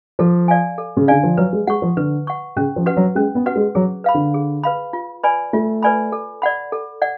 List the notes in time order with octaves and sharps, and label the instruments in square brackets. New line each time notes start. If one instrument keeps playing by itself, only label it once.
[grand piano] F3 [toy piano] A4
[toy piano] D5 F5 G#5
A4
[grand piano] C#3
[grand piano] D3 [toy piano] D5 F5 G#5
[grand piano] F3
[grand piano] F#3 [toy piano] B4
[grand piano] G#3
[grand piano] G#3 [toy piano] F#5 C#6
[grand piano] F3
[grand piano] D3 [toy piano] B4
[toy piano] F#5 C#6
[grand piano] C#3 [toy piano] C#4
[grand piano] F3
[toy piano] F#4 B4 F#5
[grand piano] F#3
[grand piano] G#3 [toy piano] C#4
[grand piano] B3
[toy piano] F#4 B4 F#5
[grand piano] G#3
[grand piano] F#3 [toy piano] G#4
[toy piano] B4 F5 B5
[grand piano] D3
[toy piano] G#4
B4 F5 B5
F4
B4 D5 G#5 B5
[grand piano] A3 [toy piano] F4
[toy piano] B4 D5 G#5 B5
A4
D5 F#5 B5
A4
D5 F#5